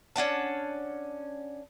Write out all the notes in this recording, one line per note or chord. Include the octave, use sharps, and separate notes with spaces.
C#4 D4 F#5 A5